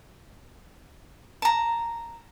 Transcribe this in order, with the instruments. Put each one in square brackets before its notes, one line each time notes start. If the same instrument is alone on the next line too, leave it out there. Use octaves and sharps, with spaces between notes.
[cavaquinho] A5 A#5